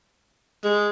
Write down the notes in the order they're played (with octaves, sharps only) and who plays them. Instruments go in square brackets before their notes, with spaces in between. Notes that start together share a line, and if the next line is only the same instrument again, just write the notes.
[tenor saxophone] G#3